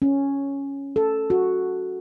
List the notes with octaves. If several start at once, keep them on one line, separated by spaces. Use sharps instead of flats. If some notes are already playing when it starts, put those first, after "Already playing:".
C#4
A4
F#4